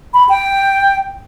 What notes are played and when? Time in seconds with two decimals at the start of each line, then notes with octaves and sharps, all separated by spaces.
0.14 B5
0.29 G5